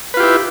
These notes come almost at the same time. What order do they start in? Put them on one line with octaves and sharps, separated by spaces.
B4 F4 G4 E4